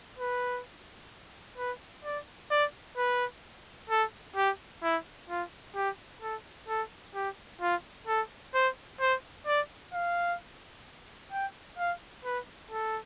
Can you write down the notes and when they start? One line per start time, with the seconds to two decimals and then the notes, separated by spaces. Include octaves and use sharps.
0.19 B4
1.58 B4
2.05 D5
2.51 D5
2.97 B4
3.90 A4
4.36 G4
4.83 E4
5.29 F4
5.76 G4
6.22 A4
6.68 A4
7.15 G4
7.61 F4
8.07 A4
8.54 C5
9.01 C5
9.47 D5
9.94 F5
11.32 G5
11.78 F5
12.25 B4
12.71 A4